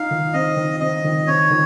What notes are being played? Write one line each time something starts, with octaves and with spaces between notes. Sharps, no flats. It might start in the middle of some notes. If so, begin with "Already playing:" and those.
Already playing: D#4 F5
D#3
C4 D#5
D#3
C4 D#5
D#3
C4 C#5
D#3